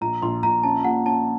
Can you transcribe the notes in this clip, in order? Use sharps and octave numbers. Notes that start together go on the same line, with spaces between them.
A#1 A#5
A#1 C6
A#1 A#5
C#4 A5
A#2 F#5
C#4 A5